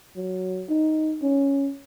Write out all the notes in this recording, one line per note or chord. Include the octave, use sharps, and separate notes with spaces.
F#3
D#4
C#4